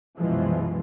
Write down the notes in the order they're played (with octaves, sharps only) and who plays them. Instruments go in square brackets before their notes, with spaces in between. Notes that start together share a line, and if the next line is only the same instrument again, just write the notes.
[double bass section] C2 F#2 B2 E3 F3 G#3